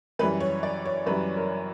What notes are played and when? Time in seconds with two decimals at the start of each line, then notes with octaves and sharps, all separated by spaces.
0.19 F#2 E3 G3 B4
0.40 C#5
0.63 D5
0.85 C#5
1.06 F#2 E3 G3 B4
1.36 A#4